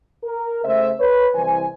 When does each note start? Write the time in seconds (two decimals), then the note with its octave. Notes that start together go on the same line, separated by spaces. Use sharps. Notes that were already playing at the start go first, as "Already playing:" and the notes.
0.24 A#4
0.64 C#3 A3 C5 E5
1.00 B4 C#5
1.35 C2 E3 C5 G#5